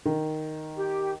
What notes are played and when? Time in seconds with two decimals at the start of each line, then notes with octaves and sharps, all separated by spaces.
0.06 D#3
0.76 G4